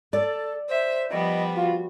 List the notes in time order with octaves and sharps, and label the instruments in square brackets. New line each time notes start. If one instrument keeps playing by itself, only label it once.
[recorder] A4 [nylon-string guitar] D5
[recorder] C5 [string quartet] E5
[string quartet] F3 G3 B3 [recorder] D#5
[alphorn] F4 [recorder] F#4